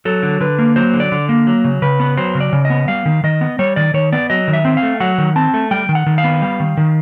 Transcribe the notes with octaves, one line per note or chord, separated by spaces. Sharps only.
F#3 A4
D3
D3 B4
A#3
F#3 C5
D3
D5
D3
A#3
F#3
C#3
C#3 B4
B3
F#3 C5
C#3
D5
C#3
D#5
B3
G3 F5
D#3
D#3 D#5
B3
G3 C#5
D#3 D5
D#3 C#5
B3 D5
F#3 D#5
D#3
E5
C4
F5
A3
F#3 F#5
D#3
C4 A5
A3
G3 G5
D#3
F#5
D#3
F5
B3
G3
D#3
D#3